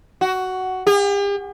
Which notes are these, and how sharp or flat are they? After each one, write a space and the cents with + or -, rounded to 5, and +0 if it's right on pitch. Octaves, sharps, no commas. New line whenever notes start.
F#4 +10
G4 +45